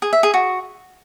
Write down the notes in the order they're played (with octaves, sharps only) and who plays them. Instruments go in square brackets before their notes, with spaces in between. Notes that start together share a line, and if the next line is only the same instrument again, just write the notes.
[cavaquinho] G#4
E5
G#4
F#4